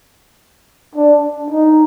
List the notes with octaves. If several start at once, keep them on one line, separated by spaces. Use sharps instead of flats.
D4
D#4